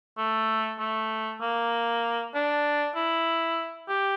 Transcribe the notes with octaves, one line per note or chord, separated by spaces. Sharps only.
A3
A3
A#3
D4
E4
G4